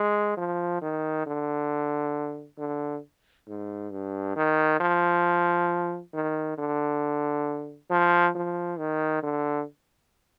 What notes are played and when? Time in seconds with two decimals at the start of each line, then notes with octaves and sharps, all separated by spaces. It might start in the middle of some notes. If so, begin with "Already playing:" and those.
Already playing: G#3
0.37 F3
0.82 D#3
1.26 D3
2.58 D3
3.48 G#2
3.91 G2
4.36 D#3
4.80 F3
6.14 D#3
6.58 D3
7.90 F3
8.36 F3
8.79 D#3
9.23 D3